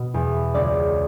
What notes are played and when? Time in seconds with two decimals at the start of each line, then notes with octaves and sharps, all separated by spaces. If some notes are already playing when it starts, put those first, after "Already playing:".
Already playing: B2
0.14 E2
0.54 C#2 D5 D6